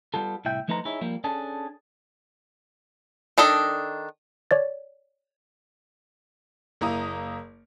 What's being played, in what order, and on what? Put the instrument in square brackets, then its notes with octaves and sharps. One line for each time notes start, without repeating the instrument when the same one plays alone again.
[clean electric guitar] G3 B3 F4 A4
C2 A2 E4 E5 G5
F3 A3 D#4 B4 C5 A#5
D#4 E4 G#4 C#5
F3 G3 A#3
C#4 D4 G#4 A4
[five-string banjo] D#3 D4 A4 D#5
[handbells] C#5 D5 A6
[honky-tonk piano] F#1 A#3 E4 A#5 D#6